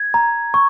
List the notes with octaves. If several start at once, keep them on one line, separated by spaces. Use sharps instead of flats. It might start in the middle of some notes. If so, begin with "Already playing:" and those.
Already playing: G#6
A#5
C#6